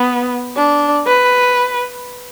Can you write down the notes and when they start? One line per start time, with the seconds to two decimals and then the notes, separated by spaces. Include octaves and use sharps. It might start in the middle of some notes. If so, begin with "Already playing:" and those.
Already playing: B3
0.56 D4
1.07 B4